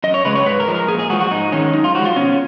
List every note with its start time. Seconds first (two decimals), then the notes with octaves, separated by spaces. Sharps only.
0.04 F#2 D#5
0.14 C#5
0.25 C#3 G#3 B4
0.35 C#5
0.46 G#2 B4
0.60 A#4
0.67 F3 G#3
0.75 A#4
0.88 A#2 G#4
0.99 G#4
1.10 G#3 F#4
1.13 F3
1.20 F#4
1.31 G#2 D#4
1.52 D#3 G#3 C#4
1.73 F#2 D#4
1.84 F4
1.94 F3 G#3 F#4
2.05 F4
2.16 B2 C#4